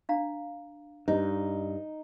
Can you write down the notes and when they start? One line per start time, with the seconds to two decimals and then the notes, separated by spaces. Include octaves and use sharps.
0.09 D4 F5 A#5
1.08 G2 D#4